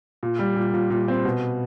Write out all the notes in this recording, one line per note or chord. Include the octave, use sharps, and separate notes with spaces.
A#2
G3
A#2
A#2
A#2
C4
B2